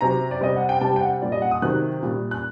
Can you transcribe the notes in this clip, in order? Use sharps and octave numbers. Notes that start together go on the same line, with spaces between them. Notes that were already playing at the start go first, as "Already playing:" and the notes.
C3 F#3 A#5
D5
C3 G3 D#5
F#5
G5
C3 G3 A5
G5
F#5
A#2 G3 D5
D#5
F#5
D#6
C3 D#3 F#3 F#6
A#2 G3
F#6